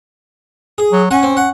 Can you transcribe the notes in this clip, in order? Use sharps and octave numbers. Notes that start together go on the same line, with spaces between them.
G#4
F#3
C#4 F#5 G#5
C4
F#5